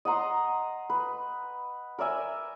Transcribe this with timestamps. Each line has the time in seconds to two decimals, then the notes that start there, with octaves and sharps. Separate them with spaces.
0.05 D#5 F#5 A#5 C6
0.90 B4
1.99 A#4 D5 E5 G#5